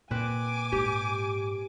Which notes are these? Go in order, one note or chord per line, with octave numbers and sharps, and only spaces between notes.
A#2 C4 B4 G#5 D6
G#2 G4